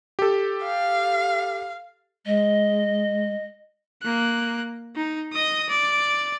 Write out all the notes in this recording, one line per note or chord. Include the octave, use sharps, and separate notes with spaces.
G4 A4
F5
G#3 D#5
A#3 F#6
D#4
D#5 D#6
D5